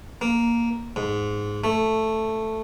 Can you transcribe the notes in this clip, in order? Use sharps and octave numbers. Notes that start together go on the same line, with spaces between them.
A#3
G#2
A3